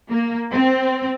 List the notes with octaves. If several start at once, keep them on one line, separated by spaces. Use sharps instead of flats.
A#3
C4